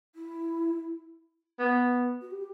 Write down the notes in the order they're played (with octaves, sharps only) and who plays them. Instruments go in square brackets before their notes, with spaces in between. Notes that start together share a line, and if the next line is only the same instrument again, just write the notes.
[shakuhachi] E4
[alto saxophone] B3
[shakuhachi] F#4
G4